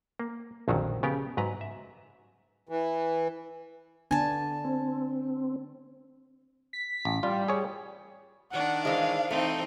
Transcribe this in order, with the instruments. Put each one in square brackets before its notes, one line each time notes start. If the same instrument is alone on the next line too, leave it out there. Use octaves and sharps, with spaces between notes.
[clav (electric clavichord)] A#3
A#1 F2 D3 D#3 F#3
C#3 B3 G4 A#4
G#2 F#3 B4 A#5
E5
[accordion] E3
[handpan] D3 B3 D4 [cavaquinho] G#5 A5
[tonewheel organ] C4
[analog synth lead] B6
[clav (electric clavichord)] A1
[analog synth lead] G3 [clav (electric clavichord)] F4
[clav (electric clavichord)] G#4 C#5
[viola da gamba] D#3 D4 [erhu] F#5
[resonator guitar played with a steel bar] E3 G#3 [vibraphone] C5 [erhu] F5
[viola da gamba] E3 C4 D#4 [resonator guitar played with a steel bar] A3